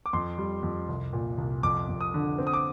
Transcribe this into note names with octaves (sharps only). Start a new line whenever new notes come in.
D6
F2 C6
G3
F2
C2
A#2
C2
F2 D6
F2
D#6
D3
C4
D#6
D6